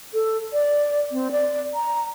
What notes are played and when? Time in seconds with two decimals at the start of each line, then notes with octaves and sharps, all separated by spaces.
0.14 A4
0.53 D5
1.12 C4
1.32 D5
1.74 A#5